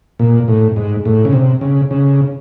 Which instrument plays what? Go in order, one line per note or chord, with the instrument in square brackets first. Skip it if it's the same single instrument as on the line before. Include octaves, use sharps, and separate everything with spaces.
[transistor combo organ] A#2
A2
G#2
A2
C#3
C3
C#3
C#3